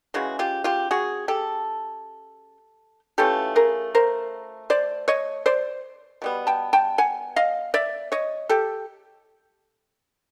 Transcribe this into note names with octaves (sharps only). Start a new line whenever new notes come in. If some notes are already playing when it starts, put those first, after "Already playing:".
C#3 E3 G#3 F#4
F4 G4
F4 G4
F#4 G#4
G4 A4
E3 A3 C#4 F4 G4 A4
G#4 A#4
A#4 C5
C5 D5
C#5 D#5
C5 D5
B2 G3 B3
G5 A5
G5 A5
F#5 G#5
D#5 F5
D5 E5
C#5 D#5
G4 A4